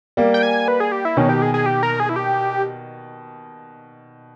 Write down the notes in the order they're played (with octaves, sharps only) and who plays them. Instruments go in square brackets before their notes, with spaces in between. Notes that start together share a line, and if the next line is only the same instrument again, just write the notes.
[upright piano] G3 A#3
[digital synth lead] G5
G#5
B4
G#4
G4
E4
[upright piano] B2 D#3 [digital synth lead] C#4
[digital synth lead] G4
G#4
G#4
G4
A#4
G#4
E4
G4